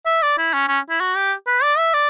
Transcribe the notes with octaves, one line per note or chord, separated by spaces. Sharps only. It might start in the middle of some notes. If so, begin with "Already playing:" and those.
E5
D5
E4
C#4
C#4
E4
F#4
G4
B4
D5
E5
D5